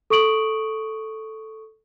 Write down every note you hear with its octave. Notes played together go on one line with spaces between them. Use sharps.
A4 C#6 D#6 D7 F#7